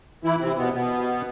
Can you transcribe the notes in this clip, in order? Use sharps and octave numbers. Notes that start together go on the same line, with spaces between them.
E3 E4
C3 C4
B2 B3
B2 B3